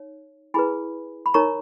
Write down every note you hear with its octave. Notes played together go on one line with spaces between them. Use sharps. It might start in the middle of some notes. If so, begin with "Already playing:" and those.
Already playing: D#4 C#5
E4 G#4 B4 G#5 B5
B5
D#4 A#4 C#5 A#5 C#6